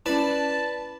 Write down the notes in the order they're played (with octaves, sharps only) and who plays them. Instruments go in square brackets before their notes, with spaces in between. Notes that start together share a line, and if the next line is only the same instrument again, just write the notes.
[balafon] C#4 E4 [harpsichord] B4 D5 B5 [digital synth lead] A5